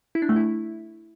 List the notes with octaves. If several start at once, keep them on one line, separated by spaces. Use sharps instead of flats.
E4
D4
A3
E4